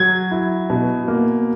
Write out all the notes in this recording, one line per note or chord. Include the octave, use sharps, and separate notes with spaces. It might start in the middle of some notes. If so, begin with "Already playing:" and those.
Already playing: F#3 G#6
E4
B2
A#3